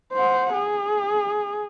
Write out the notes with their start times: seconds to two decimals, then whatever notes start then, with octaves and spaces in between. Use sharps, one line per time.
0.13 C5 F#5
0.53 G#4